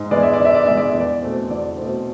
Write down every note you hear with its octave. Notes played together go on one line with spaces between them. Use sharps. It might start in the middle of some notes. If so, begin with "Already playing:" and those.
Already playing: G#2
E3 G#3 B3 D5
E5
D5
G#2
E5
D5
E3 G#3 B3 E5
D5
E5
E2
D5
B2 A3 C4
E2 D5
B2 A3 C4